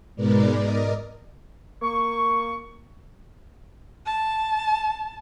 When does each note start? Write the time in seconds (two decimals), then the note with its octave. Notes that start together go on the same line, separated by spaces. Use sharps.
0.16 G#2 B2 G#3 A#4 B4 D5
0.57 A#4 D5 D#5
1.82 A#3 C#6
4.06 A5